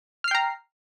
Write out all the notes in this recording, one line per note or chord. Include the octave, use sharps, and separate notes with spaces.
G5 A#5 F6 C7